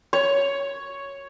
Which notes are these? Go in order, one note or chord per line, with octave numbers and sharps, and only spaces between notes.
C#5